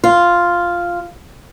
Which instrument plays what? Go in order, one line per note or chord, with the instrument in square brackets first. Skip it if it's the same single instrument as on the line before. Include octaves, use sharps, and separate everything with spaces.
[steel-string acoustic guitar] F4